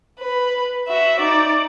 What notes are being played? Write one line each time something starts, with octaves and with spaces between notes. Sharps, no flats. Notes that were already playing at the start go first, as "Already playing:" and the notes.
B4
F#4 E5
D#4 D5